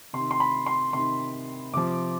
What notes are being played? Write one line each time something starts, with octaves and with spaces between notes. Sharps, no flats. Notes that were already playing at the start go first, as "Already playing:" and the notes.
C3 D#3 C6
C6
B5
C6
C3 D#3 C6
C3 F3 D6